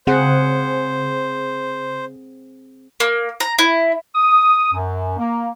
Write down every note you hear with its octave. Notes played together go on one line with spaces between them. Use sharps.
C#3 C4 G#4 C5 F#5
A#3
A#5
E4
D#6
F#2
A#3